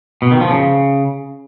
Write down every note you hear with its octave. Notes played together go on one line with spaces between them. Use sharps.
B2
D#3
F3
C#3